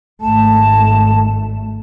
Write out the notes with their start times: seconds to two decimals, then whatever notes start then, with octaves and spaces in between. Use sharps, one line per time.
0.21 G#1 A3 A5